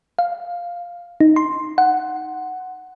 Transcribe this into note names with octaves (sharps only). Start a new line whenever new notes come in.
F5
D#4
C6
F#5